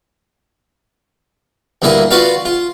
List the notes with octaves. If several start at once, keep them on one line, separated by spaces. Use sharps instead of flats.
D2 G2 A#3 E4 D#6
F4 F#4 B4 D5 F5
F4